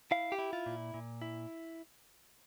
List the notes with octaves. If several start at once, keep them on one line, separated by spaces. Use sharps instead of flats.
E4 F5
G4
E4
F4
A#2
A#2
E4